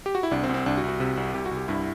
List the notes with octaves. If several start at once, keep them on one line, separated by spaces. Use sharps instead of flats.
G4
F#4
E4
C2 D4
C4
C2
C4
C2 D4
F#4
C2
F#4
C3
C2
C2 G4
F#4
C2
G4
G2 E4